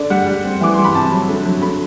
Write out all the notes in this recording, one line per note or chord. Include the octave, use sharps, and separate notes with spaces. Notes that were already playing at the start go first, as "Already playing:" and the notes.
Already playing: D3 D5
G3 F#5
G3
C4
E3 D6
G3 C6
B5
C3 A5
F#3
D3
F#3
D3 B5